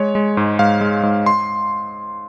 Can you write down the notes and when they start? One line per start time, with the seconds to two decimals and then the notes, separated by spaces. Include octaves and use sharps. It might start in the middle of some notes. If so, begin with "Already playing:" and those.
Already playing: G#3 C#5
0.15 G#3
0.37 G#2
0.59 G#2 F5
0.81 G#3
1.03 G#2
1.26 C6